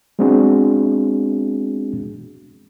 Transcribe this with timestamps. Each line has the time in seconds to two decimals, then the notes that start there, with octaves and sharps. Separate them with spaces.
0.19 G#3 B3 C4 D4 F#4 G#4